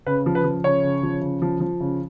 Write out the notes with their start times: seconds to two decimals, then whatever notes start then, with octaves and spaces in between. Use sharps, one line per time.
0.06 C#3 B4
0.26 F3
0.35 B4
0.44 F3
0.64 C#3 C#5
0.83 C#3
1.03 F3
1.21 C#3
1.42 F3
1.60 F3
1.80 C#3